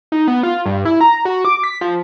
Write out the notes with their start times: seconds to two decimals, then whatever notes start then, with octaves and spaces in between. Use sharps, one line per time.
0.12 D#4
0.28 B3
0.43 F4
0.66 G2
0.85 E4
1.01 A#5
1.25 F#4
1.45 D6
1.64 B6
1.81 F3